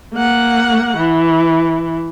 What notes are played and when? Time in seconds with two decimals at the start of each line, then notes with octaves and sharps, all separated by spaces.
0.14 A#3 F#5
0.98 E3